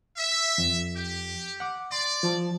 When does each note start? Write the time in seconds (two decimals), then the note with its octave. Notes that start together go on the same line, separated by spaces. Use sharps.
0.17 E5
0.58 F2
0.96 G4
1.60 F#5 D6
1.92 D5 C6
2.23 F3 A5